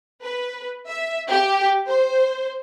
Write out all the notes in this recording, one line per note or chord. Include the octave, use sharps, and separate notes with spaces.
B4
E5
G4
C5